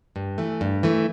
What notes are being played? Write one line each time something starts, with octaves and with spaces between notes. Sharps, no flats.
G2
E3 A3
G2
E3 A3